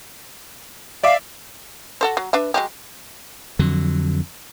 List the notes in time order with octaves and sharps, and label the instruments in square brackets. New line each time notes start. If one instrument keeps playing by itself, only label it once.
[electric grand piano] D5 E5 D6 [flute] F5
[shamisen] F#4 A4 C5
F#3
D4 B4 E5
F#3 G#3 G4
[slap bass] F2 D3 F#3